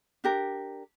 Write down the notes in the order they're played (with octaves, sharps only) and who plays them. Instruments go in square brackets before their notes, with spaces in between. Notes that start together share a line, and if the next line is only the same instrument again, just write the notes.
[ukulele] D4 G4 A#4